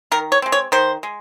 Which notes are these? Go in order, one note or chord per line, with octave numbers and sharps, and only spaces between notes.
D#3 A#4
C#5
G#3 C4
C#5
D#3 C5
G#3